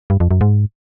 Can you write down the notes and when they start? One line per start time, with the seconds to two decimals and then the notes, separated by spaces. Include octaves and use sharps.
0.10 G2
0.20 F2
0.31 F#2
0.41 G#2